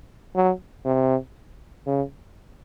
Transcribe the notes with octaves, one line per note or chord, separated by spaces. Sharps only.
F#3
C3
C#3